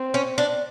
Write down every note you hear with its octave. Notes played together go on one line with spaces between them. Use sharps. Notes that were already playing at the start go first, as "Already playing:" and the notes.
Already playing: C4
C#4
D4